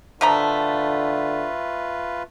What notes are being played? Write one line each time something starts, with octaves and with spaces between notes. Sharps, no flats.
D3 F3 A3 F4 B4 A#5